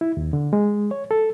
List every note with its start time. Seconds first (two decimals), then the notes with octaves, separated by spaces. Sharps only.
0.01 E4
0.17 D#2
0.33 D3
0.53 G#3
0.91 C#5
1.11 A4